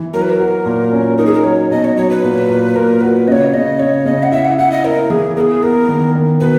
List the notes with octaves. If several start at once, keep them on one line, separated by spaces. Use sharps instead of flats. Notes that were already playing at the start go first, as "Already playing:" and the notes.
Already playing: E3
F#3 A#4
B4
A#4
F#4
A#2
C#4
D#4 A#4
G#4
A#4
F#3 C#5
B2 D#5
C#5
F#3 C#5
B4
A#2
A#2
A#2 A#4
F#4 B4
C#3 C#5 D#5
C#3 D#5
C#3 C#5
C#3 D#5
F#5
E4 E5
F#5
E4 F#5
D#5
E4 A#4
E3 G#4
B3 G#4 A#4
B3 A#4
D#3
D#3
B2 B4